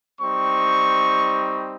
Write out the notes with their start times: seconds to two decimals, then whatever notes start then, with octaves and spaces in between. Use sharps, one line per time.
0.21 G3 C4 D#4 C#6